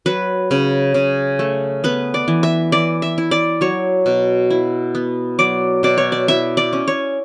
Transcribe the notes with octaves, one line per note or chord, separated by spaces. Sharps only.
F#3 B4
C#3
C#3
A3
B3 B4
D5
E3
E5
E3 D5
E5
E4
D5
F#3 C#5
B2
E4
B3
F#3 D5
B2 D5
C#5
D5
E4 E5
D5
C#4
C#5